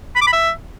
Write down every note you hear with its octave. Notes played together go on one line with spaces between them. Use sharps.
B5
D6
B5
E5